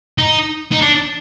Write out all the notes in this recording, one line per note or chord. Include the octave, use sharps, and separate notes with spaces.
D#4
D#4
D4